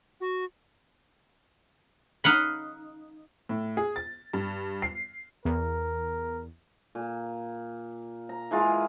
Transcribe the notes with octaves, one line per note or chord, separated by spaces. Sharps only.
F#4
D#4 F5 F#5 B5
A2
G#4
A6
G2
C7
E2 A#4
A#2
A#5
E3 G#3 F4 A#4